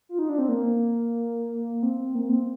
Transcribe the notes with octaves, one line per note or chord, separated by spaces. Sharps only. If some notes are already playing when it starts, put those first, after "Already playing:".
F4
D#4
D4
C4
A#3
C4
A#3
C4